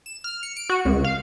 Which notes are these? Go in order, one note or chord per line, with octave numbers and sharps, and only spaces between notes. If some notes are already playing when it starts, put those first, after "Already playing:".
E7
F6
C#7
D7
F#4
C#2
F5